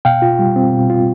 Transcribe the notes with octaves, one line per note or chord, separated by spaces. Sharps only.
B2 F5 G5
F4
G3
C4
B2
F4